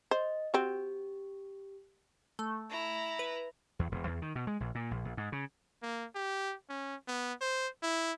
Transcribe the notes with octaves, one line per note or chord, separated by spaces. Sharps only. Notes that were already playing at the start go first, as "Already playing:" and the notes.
C5 D#5
C4 F#4 G4
A3
E4 A#5
B4
E2
E1
E2
D#3
B2
G#3
A#1
A#2
A#1
A#1
G#2
C#3
A#3
G4
C#4
B3
C5
E4